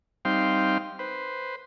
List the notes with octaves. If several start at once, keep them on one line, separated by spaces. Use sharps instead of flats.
G3 C4 D#4 F5 G5 C6
B4 C5